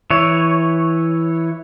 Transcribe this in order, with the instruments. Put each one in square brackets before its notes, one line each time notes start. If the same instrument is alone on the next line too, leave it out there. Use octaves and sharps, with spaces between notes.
[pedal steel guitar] E3 C#5